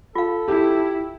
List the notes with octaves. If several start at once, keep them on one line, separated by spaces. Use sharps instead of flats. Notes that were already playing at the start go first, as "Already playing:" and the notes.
F4 A4 F5
E4 G4